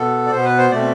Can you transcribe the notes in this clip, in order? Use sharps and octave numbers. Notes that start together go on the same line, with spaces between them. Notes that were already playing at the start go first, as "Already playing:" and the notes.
Already playing: B2 B3 A4
D5
B2 B3 C5
B4
C5
B2 A3 C4 D5